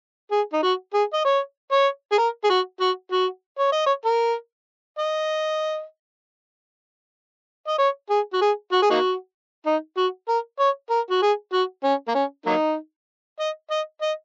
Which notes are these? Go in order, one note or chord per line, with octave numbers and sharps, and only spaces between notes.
G#4
D#4
F#4
G#4
D#5
C#5
C#5
G#4
A#4
G#4
F#4
F#4
F#4
C#5
D#5
C#5
A#4
D#5
D#5
C#5
G#4
F#4
G#4
F#4
G#4
A#3 D#4 F#4
D#4
F#4
A#4
C#5
A#4
F#4
G#4
F#4
C#4
A#3
C#4
F#3 A#3 D#4
D#5
D#5
D#5